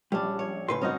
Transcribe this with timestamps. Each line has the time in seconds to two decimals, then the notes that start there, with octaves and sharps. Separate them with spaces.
0.12 A#1 G3 C#4 D4
0.39 C#5
0.68 A2 C#3 B4 C6
0.81 G1 C4 C#4 D#4 F#4 D#5